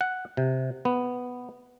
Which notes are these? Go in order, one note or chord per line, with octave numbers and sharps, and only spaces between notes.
F#5
C3
B3